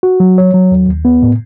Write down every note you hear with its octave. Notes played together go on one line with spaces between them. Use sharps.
F#4
F#3
C#5
F#3
D#2
D#2
B3
A2